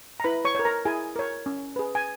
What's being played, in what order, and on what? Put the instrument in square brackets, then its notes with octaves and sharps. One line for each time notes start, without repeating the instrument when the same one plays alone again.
[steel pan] A#5
E4 B4 B5
C#5 C#6
A#4 C#5
A#4 A#5
E4 G#4 G#5
A#4 C#5
C#4
G#4 B4
G#5